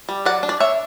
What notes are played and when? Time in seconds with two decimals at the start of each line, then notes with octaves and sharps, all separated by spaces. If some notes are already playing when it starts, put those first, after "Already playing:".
0.09 G3
0.25 F#3 D5 F#5
0.43 D4
0.49 D5
0.60 D4 C#5 E5